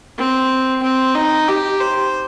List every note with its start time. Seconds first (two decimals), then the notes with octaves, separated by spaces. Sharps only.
0.18 C4
0.83 C4
1.15 D#4
1.48 G4
1.80 C5